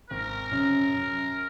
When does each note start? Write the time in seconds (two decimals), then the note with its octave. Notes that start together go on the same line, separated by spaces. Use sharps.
0.10 G#1 A#4
0.51 F#2 C#3
0.94 F#2